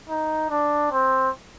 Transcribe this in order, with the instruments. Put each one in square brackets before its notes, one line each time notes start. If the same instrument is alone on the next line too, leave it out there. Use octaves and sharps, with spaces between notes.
[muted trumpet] D#4
D4
C4